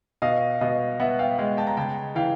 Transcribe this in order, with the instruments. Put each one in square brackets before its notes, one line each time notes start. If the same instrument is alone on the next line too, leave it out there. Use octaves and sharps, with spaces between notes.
[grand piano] B2 [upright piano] D#5 F5
[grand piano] B2 [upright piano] D#5 F5
[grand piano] B3 [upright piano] E5 F#5
[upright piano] F5 G5
[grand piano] G#3 [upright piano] F5 G5
[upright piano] G5 A5
A#5
[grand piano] C#3 [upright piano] G5 A5
[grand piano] E3 [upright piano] F5 G5